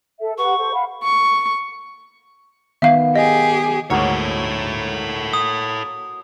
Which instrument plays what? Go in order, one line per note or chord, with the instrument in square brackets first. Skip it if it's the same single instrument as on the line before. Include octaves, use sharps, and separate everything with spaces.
[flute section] A4 E5
[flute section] G4 B4 F#5 [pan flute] C#6
[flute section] A4 C5
F5 F#5 B5
[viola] C#6
[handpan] D#3 B3 [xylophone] E5 F5
[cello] G4 G#4 [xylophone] D#5
[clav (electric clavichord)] D2 G#2 [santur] F#3 A#3 [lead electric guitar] A4 C#5
[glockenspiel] D#6